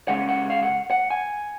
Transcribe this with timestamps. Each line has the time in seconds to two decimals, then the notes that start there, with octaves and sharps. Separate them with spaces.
0.08 C#2 C#3 G#3 C#4 F#5
0.29 F#5
0.50 F5
0.63 F#5
0.91 F#5
1.10 G#5